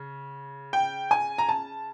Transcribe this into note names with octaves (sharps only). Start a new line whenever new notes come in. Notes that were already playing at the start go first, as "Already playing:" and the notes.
Already playing: C#3
G5
G#5
A#5
A5